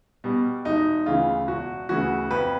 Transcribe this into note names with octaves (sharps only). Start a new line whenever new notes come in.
B2 G3
E1 D#4
D2 C#3 E3 F4
E1 F#4
D2 C#3 E3 F#4
F2 B4